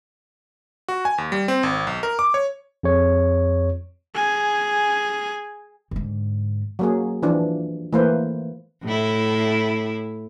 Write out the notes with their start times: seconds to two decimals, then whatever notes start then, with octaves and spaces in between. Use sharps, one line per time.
0.88 F#4
1.05 G#5
1.18 D#2
1.32 G3
1.48 C4
1.63 G#1
1.87 B1
2.03 A#4
2.19 D6
2.34 C#5
2.83 F2 G#4 C#5
4.15 G#4 G#5
5.91 G#2 D3
6.79 F#3 A#3 G#4
7.23 E3 F3 D4
7.93 E3 A3 A#3 B4 C5
8.84 A2 E4